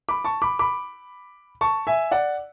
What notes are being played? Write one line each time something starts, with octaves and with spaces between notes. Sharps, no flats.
B5 D6
A5 C#6
B5 D6
B5 D6
A5 C#6
E5 G#5
D5 F#5